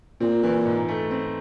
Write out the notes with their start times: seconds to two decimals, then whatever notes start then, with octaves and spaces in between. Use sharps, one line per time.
0.20 A#2 C4
0.43 E3
0.65 G#2
0.88 A3
1.11 C4